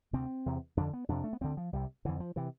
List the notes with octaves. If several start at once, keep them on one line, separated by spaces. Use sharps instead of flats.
D2 C3 C4
E2 C3
F2 D3 D4
B3
F2 C3 D4
A3
B3
D2 D3 C4
F3
C2 C3 G3
F2 D3 E3
F3
C3 E3